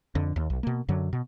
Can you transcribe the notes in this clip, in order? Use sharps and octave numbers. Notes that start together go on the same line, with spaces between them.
F2 D3
D#2
B1
B2 A#3
F#2 D3 F#3
B2